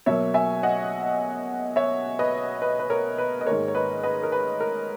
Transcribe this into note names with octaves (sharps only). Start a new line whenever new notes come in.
B2 F#3 A#3 C#5 E5
E5 G#5
D#5 F#5
C#5 E5
B4 D#5
B4
B4
A#4 C#5
B4
D#5
G#2 D#3 A#3 A#4 C#5
C#5
B4 D#5
B4 D#5
A#4
B4
A#4